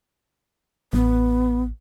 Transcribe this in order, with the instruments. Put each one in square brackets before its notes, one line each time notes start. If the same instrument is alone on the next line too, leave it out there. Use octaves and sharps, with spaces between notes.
[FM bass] A1 [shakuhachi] B3